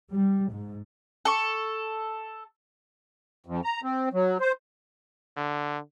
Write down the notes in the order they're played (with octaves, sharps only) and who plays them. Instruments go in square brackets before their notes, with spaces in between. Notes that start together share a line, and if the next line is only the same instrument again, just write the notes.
[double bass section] G3
G#2
[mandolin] A4 C#6
[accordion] F2
A#5
C4
F#3
C5
[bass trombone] D3